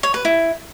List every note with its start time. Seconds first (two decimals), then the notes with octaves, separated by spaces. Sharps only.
0.03 C#5
0.14 B4
0.25 E4